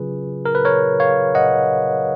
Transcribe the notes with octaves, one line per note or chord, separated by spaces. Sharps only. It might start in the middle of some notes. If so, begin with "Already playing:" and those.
Already playing: C#3 F#3 C#4 F4 G#4 B4
A#4
B4
A#4 C#5
C#5 F5
D#5 F#5